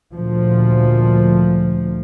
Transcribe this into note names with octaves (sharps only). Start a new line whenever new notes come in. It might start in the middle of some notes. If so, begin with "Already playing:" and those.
D2 A#2 F3